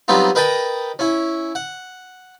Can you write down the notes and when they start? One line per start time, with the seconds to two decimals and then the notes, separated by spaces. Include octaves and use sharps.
0.08 F#3 G3 B3 C4 D#4 F4
0.35 A#4 B4 D#5 G5 A5 B5
0.99 C#4 E4
1.55 F#5